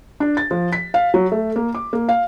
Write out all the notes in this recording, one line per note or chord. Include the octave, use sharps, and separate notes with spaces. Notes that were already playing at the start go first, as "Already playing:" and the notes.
D4
A6
F3
B6
F5
F#3
A3
A#3
D6
A#3
F5